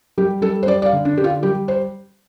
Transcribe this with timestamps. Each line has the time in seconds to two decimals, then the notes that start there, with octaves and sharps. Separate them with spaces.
0.18 G3 G4
0.42 G3 A4
0.63 C5
0.67 G3 D5
0.82 D5
0.86 F5
0.93 D3
1.05 D4
1.17 D3 G4
1.24 F4
1.43 G3 G4
1.68 C5